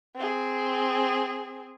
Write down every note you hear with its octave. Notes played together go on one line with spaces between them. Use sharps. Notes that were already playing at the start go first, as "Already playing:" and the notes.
C4 G#4